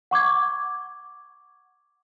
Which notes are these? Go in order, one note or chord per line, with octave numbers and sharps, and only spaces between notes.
F#5 C#6 D6 G#6